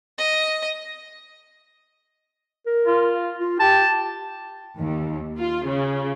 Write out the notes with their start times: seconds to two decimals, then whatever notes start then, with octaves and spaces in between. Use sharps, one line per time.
0.18 D#5
2.66 A#4
2.87 F4
3.39 F4
3.60 G4 A5
4.78 D#2
5.38 F4
5.66 C#3